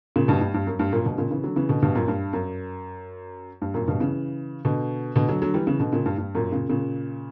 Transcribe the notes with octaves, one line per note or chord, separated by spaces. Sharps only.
A#2 C#3
G2 B2
G2
G2
F#2
G2
F#2 A#2
G2 B2
A#2 C#3
C#3 E3
D3 F#3
C#3 E3
B2 D3
G2 B2
F#2 A#2
G2
F#2
G2
F#2 A#2
G2 B2
C#3 E3
B2 D3
B2 D3
D3 F#3
D3 F#3
E3 G3
C#3 E3
B2 D3
A#2 C#3
G2
G2
F#2 A#2
A#2 C#3
A#2 C#3